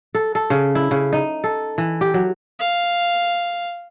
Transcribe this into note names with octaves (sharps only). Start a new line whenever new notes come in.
A4
A4
C#3
E4
C#3
D#4
A4
E3
G4
F#3
F5